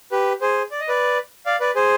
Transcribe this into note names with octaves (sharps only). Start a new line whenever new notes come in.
G4 B4
G#4 C5
D5
D#5
B4 D5
D5 F5
B4 D5
G#4 C5